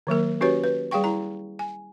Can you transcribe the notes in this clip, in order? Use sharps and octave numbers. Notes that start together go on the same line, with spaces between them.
D#3 F#3 A#3 A#4
C#4 F#4 G4 B4 C#5
B4
G3 G#4 F5 G5 C#6
E4 A#5
G#5